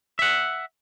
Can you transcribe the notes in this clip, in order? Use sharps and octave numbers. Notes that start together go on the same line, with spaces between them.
E5 F#5